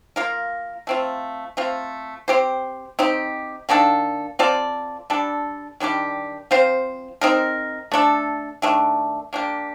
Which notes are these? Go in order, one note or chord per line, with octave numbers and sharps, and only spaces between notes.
A#3 F4 A#4
A3 C4 F4
A3 C4 F4
C4 G4 C5
C4 D#4 G4
D#3 A#3 D4 A4
C4 F4 A4 D5
G3 D4 A4
D#3 G3 D4 G4
F3 C4 F4 C5
C4 D#4 A#4
A3 D4 A4
D#3 A3 D4
A#3 D4 G4